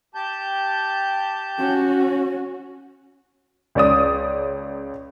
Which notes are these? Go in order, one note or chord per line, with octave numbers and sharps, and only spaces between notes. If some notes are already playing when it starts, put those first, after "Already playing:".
G4 A5 G6
C#4 F#4
C#2 C#4 D5 D#6